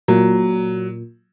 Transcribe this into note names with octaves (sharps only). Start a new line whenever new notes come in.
A#2 F#3